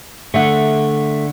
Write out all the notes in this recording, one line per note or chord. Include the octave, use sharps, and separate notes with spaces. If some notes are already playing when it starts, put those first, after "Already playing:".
D3 A3 E5 F#5